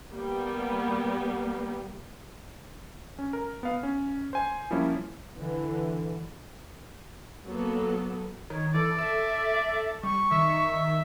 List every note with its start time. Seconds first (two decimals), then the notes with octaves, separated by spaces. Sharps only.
0.13 G3 A#3 B3
3.19 C#4
3.33 A#4
3.63 B3 F5
3.83 C#4
4.33 C5 G#5
4.71 F3 G3 A#3 C#4 E4
5.37 D3 E3
7.46 F#3 A#3 B3 A4
8.50 D#3 C#5
8.74 E3 A4 D5
8.98 A4 E5
10.03 G3 C#6
10.31 D#3 E5